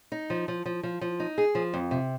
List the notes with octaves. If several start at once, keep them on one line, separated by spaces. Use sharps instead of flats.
D#4
F3
F3
F3
F3
F3
D#4
G#4
F3
F2
C3